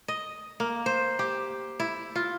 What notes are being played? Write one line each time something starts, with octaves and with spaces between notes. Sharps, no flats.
D#5
A#3
C5
G4
E4
F4